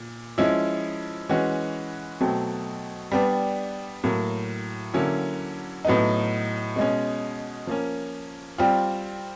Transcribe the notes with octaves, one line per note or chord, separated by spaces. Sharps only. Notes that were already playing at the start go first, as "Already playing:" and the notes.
Already playing: A#2
F3 G#3 C#4 E4
E3 G#3 C#4 F#4
B2 F#3 A3 C4
G3 B3 D4
A2 F#3 A#3
D3 F#3 A#3 C#4 E4
A2 F#3 B3 D#4
B2 G#3 C#4
F3 A#3 C#4
G3 C4 F4